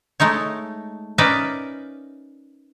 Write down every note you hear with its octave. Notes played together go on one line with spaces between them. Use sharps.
G#3 A3 D#4 C#5
C#4 D#4 A#4 B4 D5 E5